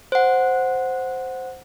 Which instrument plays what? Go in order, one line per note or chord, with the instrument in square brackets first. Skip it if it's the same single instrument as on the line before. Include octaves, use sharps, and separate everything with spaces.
[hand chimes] C5 F#5